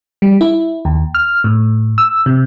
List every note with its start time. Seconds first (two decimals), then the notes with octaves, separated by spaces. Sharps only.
0.22 G3
0.41 E4
0.85 D#2
1.15 F6
1.44 A2
1.98 E6
2.26 C3